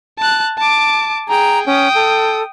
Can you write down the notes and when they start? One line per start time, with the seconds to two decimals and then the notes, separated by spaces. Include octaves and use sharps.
0.19 A5 F#6
0.58 A5 D6
1.28 G#4 G5 A#5
1.66 C#4 G5 D#6
1.95 A4